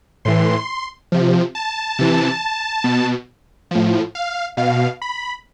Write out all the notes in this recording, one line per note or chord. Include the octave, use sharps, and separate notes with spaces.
A2 E3 C6
C3 F3
A5
C3 E3
B2
A2 F3
F5
B2 F5
B5